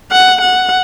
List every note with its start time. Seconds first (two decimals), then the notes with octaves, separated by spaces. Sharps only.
0.12 F#5
0.41 F#5